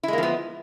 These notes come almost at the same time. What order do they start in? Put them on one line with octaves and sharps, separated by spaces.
E4 G#3 A#3 F3 B3